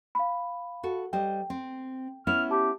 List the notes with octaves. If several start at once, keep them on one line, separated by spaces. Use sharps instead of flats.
F5 B5
F#4 A4
G3 C5 D#5 G5
C4
B3 C#4 E4 F6
G4 A5